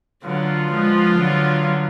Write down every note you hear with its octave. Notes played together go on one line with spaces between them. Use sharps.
D3 F#3 B3 D4 F4
F3 G#3
D3 F#3